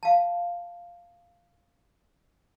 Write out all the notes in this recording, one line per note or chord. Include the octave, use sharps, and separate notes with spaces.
F5 A5